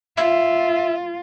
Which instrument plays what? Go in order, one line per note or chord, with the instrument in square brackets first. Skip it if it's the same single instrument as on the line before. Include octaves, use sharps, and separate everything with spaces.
[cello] F4 [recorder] E5